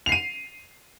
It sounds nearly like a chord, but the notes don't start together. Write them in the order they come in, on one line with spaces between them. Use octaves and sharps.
F7 C7 D#7